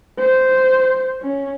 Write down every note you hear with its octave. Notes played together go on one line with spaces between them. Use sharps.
C5
C#4